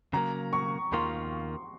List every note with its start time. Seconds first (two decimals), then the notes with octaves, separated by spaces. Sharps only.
0.13 C#3 F#3 A#3 A#5
0.53 C#6
0.92 D#2 D#3 A#3 F4 C6